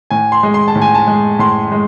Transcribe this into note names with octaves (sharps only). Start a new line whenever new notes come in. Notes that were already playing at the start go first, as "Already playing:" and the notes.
A2 G#5
C6
G#3
C6
A5
A2
G#5
A5
G#3
A2 C6
G#3